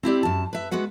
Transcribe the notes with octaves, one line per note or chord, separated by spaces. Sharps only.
C4 E4 G4 D5
F#2 A5
B4 E5
G#3 B3 F#4 B4 F#5